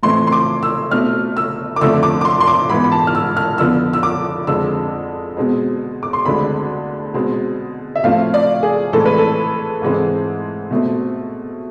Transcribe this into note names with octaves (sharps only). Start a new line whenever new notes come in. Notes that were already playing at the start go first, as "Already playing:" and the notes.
A2 E3 A3 C4 C6
C6
D6
E6
B2 A3 C4 F6
E6
D6
F2 D3 F3 A3 C4 E6
D6
D6
C6
C6
D6
G#2 E3 B3 B5
B5
A5
F6
E6
F6
F2 D3 F3 B3 E6
E6
D6
F2 D3 G#3 C4 E6
B2 G#3 C4
D6
C6
D2 D3 G#3 C4 B5
B2 G#3 C4
E5
A2 F3 A3 C4 F5
D5
G#4
A2 E3 G#3 C4 A4
B4
A4
G#2 E3 G#3 C4
B2 A3 C4